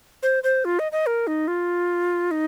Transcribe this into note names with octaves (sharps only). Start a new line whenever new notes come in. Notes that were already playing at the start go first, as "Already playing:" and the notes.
C5
C5
F4
D#5
D#5
A#4
D#4
F4
D#4